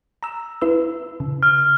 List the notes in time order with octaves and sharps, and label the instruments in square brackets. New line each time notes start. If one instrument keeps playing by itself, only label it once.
[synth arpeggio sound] A#5 E6
E4 B4 E6
C#3
[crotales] F6